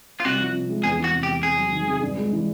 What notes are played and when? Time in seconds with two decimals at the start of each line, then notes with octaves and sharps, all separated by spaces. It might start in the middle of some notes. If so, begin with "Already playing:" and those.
0.20 F4
0.25 C2 F#4
0.40 F3
0.55 C3
0.69 G#3
0.84 E2 G#4
0.99 E3 F#4
1.13 C3
1.23 G4
1.28 E2
1.43 C3 G#4
1.58 F#3
1.72 D#3
1.87 C3
2.02 G2
2.17 G#3
2.33 E3